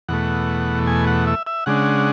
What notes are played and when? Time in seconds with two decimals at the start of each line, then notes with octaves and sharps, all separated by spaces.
0.09 E2 B2 A3 F#5
0.87 G#5
1.07 F#5
1.27 E5
1.47 E5
1.66 C#3 G#3 D4 F#5